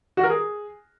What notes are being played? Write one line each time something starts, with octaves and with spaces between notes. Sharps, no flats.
F#4
A#4
G#4